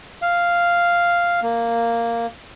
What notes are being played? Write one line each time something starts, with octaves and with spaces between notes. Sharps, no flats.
F5
A#3